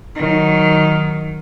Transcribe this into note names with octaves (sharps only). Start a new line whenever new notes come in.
D#3 F#3